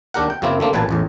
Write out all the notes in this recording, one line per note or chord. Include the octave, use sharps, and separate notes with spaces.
D#2 D4 G4 A#4 F#5
G5
F#2 C#3 A#3 C4 E4
D3 A3 A#3 C4
A1 A#2 F#3 B4 G#5 A5
A1 E2 A2